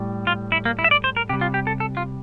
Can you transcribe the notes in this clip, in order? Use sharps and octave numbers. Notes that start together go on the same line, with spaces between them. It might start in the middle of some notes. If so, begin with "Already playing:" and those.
Already playing: A2 G3
F4
E4
A#3
E4
E5
D5
C5
A#4
C3 G3 G4
F4
G4
A4
A4
F4